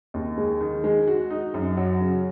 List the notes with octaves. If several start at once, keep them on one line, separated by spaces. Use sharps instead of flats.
D#2
G#3
D#3
G#3
F#4
D#4
F#2
F#3
C#3